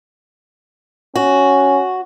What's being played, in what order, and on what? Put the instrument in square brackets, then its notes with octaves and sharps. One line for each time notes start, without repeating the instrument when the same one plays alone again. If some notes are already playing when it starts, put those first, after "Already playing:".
[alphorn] C#4 [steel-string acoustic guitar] F#4